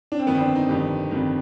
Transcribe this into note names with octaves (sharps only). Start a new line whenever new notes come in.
D4
C4
G1 F2 D#3 B3
C4
D4
D#4
G1 F2 D#3 G4
G1 F2 D#3